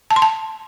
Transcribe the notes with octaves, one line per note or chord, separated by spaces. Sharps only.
A5
C6
A5